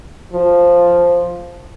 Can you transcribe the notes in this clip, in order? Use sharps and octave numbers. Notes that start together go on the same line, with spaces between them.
F3